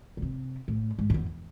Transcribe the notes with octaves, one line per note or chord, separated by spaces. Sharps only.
A2
C3
A2
G#2
F#2
E2